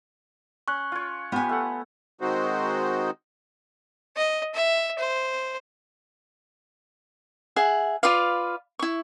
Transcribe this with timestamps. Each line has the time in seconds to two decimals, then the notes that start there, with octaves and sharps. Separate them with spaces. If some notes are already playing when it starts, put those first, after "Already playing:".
0.68 C#4 C#6 F#6
0.92 F4 C#5
1.32 B3 F4 G4 G#5
1.49 A3 A4 F#5
2.21 D#3 G#3 C4 D#4 F#4 C5
4.17 D#5
4.55 E5
4.99 C5
7.56 G#4 E5 F#5
8.03 F4 B4 D5 F5
8.79 E4 C#6